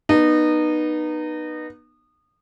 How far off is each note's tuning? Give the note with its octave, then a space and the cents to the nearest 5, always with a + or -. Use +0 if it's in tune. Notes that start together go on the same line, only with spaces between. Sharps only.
B3 -20 D#4 -25